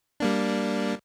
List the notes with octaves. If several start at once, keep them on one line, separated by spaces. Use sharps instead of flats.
G3 A#3 D4